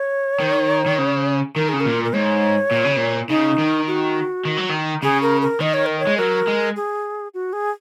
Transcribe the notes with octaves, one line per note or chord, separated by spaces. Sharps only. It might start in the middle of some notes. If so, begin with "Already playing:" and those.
Already playing: C#5
D#3
D#3
C#3
D#3 A#4
C#3 G#4
A#4
A#2
A#4
G#2 C#5
A#2
C#3
A#2
C#3 D#4
D#3
F#4
D#3
F#3
D#3
C#3 G#4
A#4
A#4
D#3 D#5
C#5
A#4
C#5
G#3
F#3 A#4
G#3
G#4
F#4
G#4